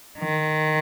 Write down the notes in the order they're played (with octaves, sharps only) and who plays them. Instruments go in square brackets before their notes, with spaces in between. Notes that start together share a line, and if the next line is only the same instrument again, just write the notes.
[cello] D#3